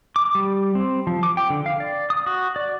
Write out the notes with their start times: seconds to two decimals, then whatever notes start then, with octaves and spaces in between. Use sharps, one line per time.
0.16 D6
0.35 G3
0.75 C4
1.07 F3
1.23 D6
1.37 G5
1.50 D3
1.66 F5
1.80 D5
2.10 D#6
2.26 F#4
2.56 D5